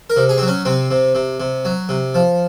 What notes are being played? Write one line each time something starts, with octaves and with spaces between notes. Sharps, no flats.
A#4
C3
G#4
F#3 C4
C#4
C3 C4
C3
C3
C3
F#3
C3
F3